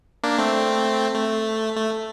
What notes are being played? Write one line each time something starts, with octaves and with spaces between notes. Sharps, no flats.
A#3 D4
A3 C4
A3
A3